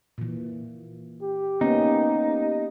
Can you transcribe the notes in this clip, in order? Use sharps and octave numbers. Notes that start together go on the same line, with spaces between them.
A#2 E3
G4
A#3 B3 C#4 D#4